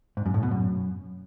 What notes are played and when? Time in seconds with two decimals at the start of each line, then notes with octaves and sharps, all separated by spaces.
0.17 G#2
0.26 F#2
0.34 A2
0.43 B2
0.51 F#2